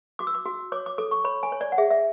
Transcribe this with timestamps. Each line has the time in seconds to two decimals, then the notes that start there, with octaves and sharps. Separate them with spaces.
0.19 F#4 D6
0.27 E6
0.35 D6
0.46 F#4
0.72 C#5 D6
0.86 D6
0.98 A4 D6
1.11 C#6
1.25 C#5 B5
1.43 G#5
1.52 C#5
1.61 D5
1.72 F#5
1.78 G#4 E5
1.91 E5